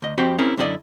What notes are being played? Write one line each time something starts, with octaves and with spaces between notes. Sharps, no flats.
D2 D#5
F2 C4 F#4 G4 B5
C4 C#4 E4 G#4 A#4
F#2 D3 E4 F#4 D5 D#5